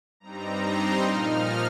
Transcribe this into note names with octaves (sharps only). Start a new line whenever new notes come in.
G2 G3 C4 D#4 A#5
C6
A#2 F3 D#4 F6